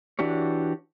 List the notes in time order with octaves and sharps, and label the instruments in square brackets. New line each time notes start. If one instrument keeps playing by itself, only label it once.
[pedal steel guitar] E3 D4 F#4 G4 C#5